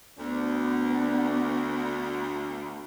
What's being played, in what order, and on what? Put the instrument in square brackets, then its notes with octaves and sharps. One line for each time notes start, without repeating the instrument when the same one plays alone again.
[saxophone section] D2 [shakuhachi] B3 [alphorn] D4